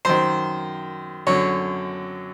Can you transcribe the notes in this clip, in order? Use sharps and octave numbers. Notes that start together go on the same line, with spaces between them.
F#2 D#3 C5
F#2 D3 C#5